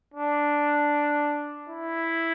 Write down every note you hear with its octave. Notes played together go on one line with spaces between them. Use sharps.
D4
E4